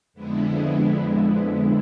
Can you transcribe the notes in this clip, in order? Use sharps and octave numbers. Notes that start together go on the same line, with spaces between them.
F2 D3 G#3 B3 E4